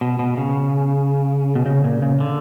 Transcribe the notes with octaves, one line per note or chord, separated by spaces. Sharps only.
B2
B2
C#3
B2
C#3
A#2
C#3
D3